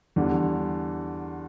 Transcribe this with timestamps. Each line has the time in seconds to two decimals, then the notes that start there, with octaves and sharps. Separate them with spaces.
0.16 E2 D3 G3